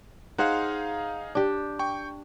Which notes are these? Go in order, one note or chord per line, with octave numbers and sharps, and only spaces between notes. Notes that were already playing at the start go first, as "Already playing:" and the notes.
D#4 G#4 C5 F5 F#5
D4 G4
G5 C#6